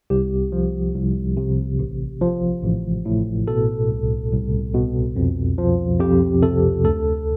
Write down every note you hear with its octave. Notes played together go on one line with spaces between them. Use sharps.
C2 G4
F3
C2
C3
A1
F3
A1
A2
B2 A4
C2
C2
B2
F2
F3
F2 G4
C3 A4
D2 A4